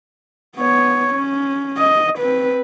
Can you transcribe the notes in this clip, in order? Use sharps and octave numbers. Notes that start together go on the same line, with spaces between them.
B3 C#5
C#4
D#5
C4 B4